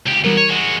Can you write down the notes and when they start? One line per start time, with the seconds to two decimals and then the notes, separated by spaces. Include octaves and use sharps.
0.06 C#2 G4
0.24 E3 F#3 G3 B3 A#4
0.38 C#5 D#7
0.50 G#3 F#4